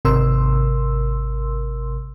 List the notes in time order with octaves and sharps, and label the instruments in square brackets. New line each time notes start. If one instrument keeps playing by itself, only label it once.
[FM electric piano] G#1 C3 A#4 C6 E6